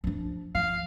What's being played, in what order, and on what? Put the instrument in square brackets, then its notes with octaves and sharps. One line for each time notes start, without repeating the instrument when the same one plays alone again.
[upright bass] F3 D4
[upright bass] F3 [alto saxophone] F5